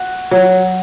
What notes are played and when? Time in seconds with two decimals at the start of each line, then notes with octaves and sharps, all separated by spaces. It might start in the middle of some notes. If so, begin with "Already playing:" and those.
Already playing: F#4
0.31 F#3